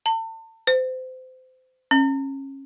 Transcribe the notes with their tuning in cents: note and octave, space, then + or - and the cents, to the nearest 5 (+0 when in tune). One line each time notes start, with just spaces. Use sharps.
A5 +35
C5 -30
C#4 -30